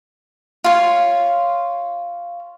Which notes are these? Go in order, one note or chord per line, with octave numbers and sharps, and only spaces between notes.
F4 C#5